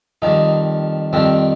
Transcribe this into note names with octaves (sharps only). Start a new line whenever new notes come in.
F2 D#3 G3 D#4
F2 D#3 G3 C4